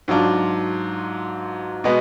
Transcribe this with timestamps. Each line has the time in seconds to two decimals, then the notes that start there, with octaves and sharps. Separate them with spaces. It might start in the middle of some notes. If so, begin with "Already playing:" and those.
0.08 G#2 F#3 D4 F4
1.84 B2 G#3 B3